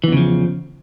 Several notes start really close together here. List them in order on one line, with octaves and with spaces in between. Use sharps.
E3 E2 C#3 F3